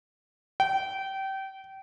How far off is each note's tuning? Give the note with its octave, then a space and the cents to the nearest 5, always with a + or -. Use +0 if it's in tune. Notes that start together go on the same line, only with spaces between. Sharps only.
G5 -25